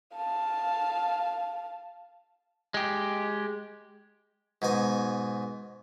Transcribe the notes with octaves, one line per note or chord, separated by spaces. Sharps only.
F5 A5
G#3 G4
G#2 B2 G#5